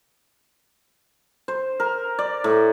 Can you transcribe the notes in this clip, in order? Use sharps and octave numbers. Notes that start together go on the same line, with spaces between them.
C5
A#4
D5
A2